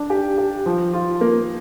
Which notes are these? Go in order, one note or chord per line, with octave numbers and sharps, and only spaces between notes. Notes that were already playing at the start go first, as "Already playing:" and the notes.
Already playing: D4
G4
G4
F3
F4
A#3